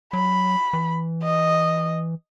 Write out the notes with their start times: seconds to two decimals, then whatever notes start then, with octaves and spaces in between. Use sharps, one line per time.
0.13 F#3 B5
0.73 E3
1.23 D#5